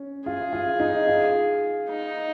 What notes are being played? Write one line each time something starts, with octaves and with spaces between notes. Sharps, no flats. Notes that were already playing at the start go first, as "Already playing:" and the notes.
Already playing: C#4
F4 G#4
F4
D#4
F4
D#4